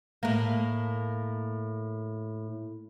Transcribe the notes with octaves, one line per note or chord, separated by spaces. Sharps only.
A2 A#3